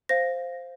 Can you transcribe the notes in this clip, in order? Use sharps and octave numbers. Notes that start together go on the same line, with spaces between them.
C5 F5 A#6